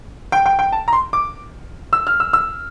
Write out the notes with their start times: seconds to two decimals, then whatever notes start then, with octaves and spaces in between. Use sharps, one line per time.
0.32 G5
0.46 G5
0.59 G5
0.72 A5
0.88 A#5
0.93 C6
1.13 D6
1.93 E6
2.07 F6
2.20 E6
2.33 E6